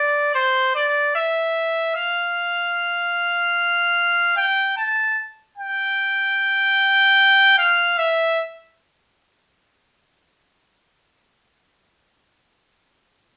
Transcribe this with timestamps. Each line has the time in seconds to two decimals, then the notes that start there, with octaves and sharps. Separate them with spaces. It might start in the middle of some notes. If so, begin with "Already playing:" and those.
Already playing: D5
0.35 C5
0.75 D5
1.16 E5
1.95 F5
4.37 G5
4.77 A5
5.58 G5
7.58 F5
7.98 E5